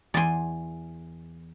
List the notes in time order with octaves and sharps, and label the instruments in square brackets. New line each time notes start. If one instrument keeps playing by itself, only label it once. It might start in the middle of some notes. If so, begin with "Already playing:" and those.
[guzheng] E2 C6 [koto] D5 G#5